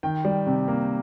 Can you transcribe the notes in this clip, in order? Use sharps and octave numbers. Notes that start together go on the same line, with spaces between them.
D#3 G5
G3
C3
A#3